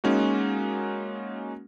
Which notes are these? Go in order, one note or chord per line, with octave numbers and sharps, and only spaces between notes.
G#3 A#3 C#4 D#4 F#4